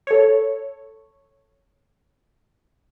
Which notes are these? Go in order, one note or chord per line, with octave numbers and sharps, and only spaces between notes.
A4 C#5